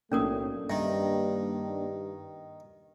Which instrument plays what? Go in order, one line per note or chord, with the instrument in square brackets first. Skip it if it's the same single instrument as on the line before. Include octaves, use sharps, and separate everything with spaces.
[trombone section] B1 A2 A3 [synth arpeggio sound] A#3 D4 [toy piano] C#4 A#4 D#6
[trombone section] G2 [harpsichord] D#3 [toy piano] E5